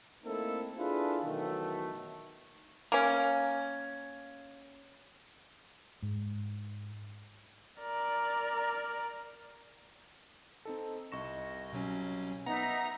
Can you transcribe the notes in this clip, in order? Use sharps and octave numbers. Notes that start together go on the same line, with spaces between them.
A3 A#3 C4 D#4 E4 A4
D4 E4 F4 G#4 A4 B4
B2 D#3 E3 F#3 A3
A#3 C#4
G#2
A#4 D5
C4 D#4 A4
C2 D#5 C#6 A#6 E7
B2 F#3 C#4
B3 D#4 D#5 E5 F#5 A#5